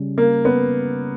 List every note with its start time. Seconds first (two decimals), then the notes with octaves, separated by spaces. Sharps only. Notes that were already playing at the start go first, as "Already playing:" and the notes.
Already playing: C#3 G3 C#4
0.18 A#3
0.45 B3